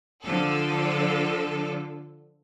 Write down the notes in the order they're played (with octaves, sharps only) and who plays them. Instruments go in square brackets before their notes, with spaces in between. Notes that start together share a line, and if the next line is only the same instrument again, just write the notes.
[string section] D3 F3 A4